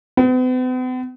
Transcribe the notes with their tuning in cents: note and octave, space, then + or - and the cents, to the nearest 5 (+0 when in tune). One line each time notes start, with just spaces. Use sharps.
B3 +45